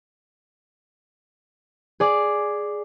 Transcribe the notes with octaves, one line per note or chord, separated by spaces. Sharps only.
G#4 D5